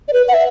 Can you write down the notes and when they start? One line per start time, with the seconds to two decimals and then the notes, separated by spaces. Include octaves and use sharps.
0.08 D5
0.13 B4
0.28 F#5
0.34 E5